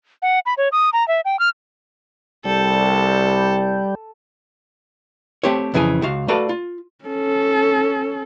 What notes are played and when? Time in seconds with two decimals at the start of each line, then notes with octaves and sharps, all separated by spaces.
0.22 F#5
0.46 B5
0.57 C#5
0.72 D#6
0.93 A#5
1.08 E5
1.25 G5
1.39 F6
2.45 C2 G3 A4
5.43 A3 C4 G4 C5 C#5
5.74 F2 C#3 E3 G#4 G#5
6.02 C#2 F#4 F5
6.28 A3 F#4 A4 B4 D5 F5
6.49 F4
7.05 C#4 A4